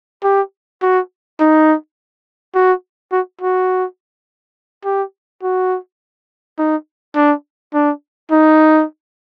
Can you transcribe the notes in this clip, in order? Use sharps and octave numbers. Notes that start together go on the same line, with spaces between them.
G4
F#4
D#4
F#4
F#4
F#4
G4
F#4
D#4
D4
D4
D#4